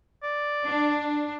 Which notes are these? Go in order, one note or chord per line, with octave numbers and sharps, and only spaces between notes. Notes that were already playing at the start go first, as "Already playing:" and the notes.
D5
D4